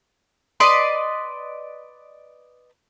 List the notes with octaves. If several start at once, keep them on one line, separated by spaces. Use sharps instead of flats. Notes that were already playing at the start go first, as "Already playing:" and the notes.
B4 D5 D#5 C6